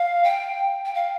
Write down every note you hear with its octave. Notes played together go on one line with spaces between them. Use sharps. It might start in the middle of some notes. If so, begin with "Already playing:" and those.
Already playing: F5
G5
G5
F5